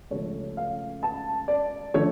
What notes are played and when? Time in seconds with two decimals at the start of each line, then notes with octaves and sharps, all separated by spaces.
0.10 C#2 C#3 F3 A3 C#5
0.57 F5
1.03 A5
1.48 D5
1.94 D3 F3 A3 C#5